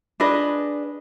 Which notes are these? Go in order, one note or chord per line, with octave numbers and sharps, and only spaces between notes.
D4 G#4 B4 D#5